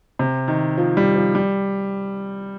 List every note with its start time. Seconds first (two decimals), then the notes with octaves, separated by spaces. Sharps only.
0.19 C3
0.48 D#3
0.77 F3
0.97 G3
1.16 F3
1.35 G3